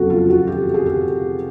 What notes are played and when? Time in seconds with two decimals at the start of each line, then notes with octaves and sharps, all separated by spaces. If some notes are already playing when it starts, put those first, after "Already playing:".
Already playing: F2 C#3 F#3 B3 F#4 A4
0.10 F4
0.30 F#4
0.47 G4
0.74 G#4
0.86 G4